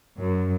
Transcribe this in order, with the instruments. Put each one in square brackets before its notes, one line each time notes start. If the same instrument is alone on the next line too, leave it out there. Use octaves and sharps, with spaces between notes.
[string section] F#2